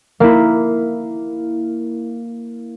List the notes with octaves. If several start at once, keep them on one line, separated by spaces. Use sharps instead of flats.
A#3 E4